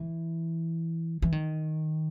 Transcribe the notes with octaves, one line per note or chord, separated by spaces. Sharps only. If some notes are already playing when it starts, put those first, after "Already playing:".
Already playing: E3
E3
D#3